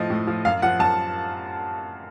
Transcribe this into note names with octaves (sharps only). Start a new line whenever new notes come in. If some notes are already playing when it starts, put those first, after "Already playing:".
Already playing: A2 F3 D#5
A2
F3
F#2 F5
F3 F#5
F#2 A5